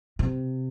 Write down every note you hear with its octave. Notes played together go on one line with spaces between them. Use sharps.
C3